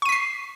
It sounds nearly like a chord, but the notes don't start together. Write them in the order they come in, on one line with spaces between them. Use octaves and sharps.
C#6 D#7 B6 C7